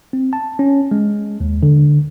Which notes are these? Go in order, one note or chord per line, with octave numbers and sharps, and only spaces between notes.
C4
A5
C#4
G#3
D#2
D3